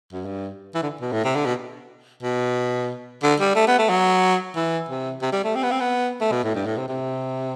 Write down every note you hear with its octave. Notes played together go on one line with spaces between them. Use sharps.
F#2
G2
E3
D3
B2
A2
C3
D3
B2
B2
D3
G3
A3
B3
A3
F#3
E3
C3
C3
G3
A3
C4
B3
C4
B3
A3
B2
A2
G2
A2
C3
C3